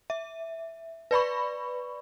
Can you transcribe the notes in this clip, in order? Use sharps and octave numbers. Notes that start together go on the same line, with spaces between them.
E5
B4 D5 B5 C#6